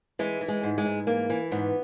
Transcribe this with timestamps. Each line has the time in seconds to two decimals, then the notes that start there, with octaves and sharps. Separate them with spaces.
0.19 E3 G#3
0.41 E3
0.48 G#3
0.63 G#2
0.78 G#3
0.85 G#2
1.07 E3 A#3
1.30 E3
1.51 G#2 B3